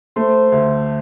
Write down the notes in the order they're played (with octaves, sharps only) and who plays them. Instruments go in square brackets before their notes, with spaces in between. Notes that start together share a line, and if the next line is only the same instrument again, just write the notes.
[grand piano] A3 [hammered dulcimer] C5
[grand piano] D2